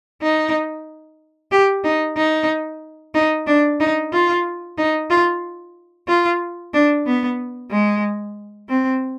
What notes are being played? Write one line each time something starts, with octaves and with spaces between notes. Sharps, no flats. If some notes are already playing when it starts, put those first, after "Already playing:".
D#4
G4
D#4
D#4
D#4
D4
D#4
F4
D#4
F4
F4
D4
B3
G#3
C4